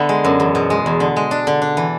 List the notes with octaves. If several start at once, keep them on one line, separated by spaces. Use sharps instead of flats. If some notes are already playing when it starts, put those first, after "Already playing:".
Already playing: D3 B3 E5
G#3
F#2
E2
B2
G#3
E2
D3
G#3
D4
D3
D4
E3